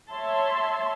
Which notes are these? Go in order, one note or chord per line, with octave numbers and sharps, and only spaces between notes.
C#5 E5 A5 C6